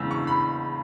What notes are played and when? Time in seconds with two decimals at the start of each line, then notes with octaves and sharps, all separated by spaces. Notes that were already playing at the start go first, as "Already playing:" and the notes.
Already playing: E2 C#3 G#3 E6
0.11 C#6
0.27 B5